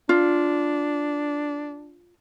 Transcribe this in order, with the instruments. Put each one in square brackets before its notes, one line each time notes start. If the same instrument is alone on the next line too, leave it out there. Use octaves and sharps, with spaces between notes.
[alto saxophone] D4 [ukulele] F4